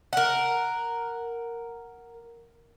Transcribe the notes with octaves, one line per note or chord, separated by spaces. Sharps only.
A#4 F#5